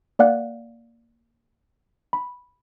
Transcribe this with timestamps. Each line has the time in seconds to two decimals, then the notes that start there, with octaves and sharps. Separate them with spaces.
0.19 A#3 D5 F5 F#5 F#6
2.13 B5